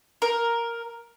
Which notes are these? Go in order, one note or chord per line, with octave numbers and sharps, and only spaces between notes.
A#4